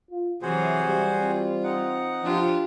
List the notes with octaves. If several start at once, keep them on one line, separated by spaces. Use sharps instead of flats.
F4
C3 E3 F#3 F#4 G#4 C5
G3
C4 F4
D#4 F#5
F3 D4 F4 G4